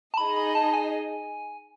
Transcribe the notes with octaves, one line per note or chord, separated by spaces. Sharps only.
A5
D#4 G#4 D#5 B5
B5
A5
G#5